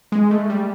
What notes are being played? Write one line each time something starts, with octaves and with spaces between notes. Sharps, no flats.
G#3
A3
G3